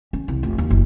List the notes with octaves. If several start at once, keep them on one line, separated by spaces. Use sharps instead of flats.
C#4
C2
F1
D#2
F#1